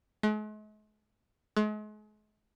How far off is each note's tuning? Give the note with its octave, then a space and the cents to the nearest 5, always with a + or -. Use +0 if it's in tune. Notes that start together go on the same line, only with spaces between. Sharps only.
G#3 +45
G#3 +40